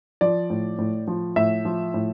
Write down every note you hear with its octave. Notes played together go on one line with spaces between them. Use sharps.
F3 D5
A2
A2
F3
A2 E5
F3
A2